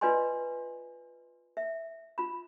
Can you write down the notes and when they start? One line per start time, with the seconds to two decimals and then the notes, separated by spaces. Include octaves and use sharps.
0.01 F4 B4 D5 D#5 G#5 C6
1.57 E5
2.18 F4 B5